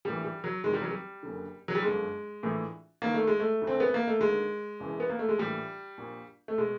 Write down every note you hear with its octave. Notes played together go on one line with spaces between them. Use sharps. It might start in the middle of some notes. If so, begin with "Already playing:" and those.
A#1 A2 E3 G3
G3
F#3
F1 E2 C3 D#3 G#3
G3
F#3
G3
F#1 F#2 D3
F#3
G3
G1 F#2 D3 G#3
A#1 A2 E3
G1 G2 D#3 A#3
A3
G#3
A3
E1 D2 D3
C4
B3
A#3
A3
D#2 D3 G#3
E1 E2 C#3 E3
B3
A#3
A3
G#3
A#1 A2 E3 G3
A#1 A#2
A3
B2 G#3